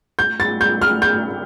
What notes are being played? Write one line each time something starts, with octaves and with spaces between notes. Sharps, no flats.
G6
A6
G6
F6
G6